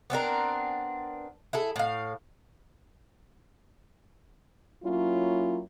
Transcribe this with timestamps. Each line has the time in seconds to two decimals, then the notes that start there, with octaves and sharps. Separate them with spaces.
0.10 B3 C4 D4 A#4
1.53 E4 G#4 A4
1.76 A2 F5
4.83 F#3 A#3 C#4 E4 F4